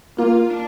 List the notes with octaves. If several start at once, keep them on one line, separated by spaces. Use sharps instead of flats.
A#3 F4
D4